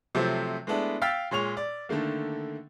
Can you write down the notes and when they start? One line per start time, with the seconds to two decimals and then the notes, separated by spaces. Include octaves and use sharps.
0.15 C3 F3 F#3 A3 C4
0.67 G#3 A3 B3 D4 E4
1.02 F5 G5 E6 F6 A6 B6
1.31 A#2 G#3 C#5 C#6 F7
1.57 D5
1.89 D3 D#3 A3 A#3